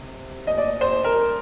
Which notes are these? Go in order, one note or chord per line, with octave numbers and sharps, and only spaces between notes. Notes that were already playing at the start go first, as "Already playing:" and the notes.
Already playing: C3
D#5
D5
C5
A#4